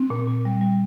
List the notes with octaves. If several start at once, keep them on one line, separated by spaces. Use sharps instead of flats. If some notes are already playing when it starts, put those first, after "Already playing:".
Already playing: C4
A#2
A#2
G3
G3